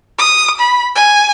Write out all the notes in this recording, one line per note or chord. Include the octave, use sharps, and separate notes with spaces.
D#6
B5
G#5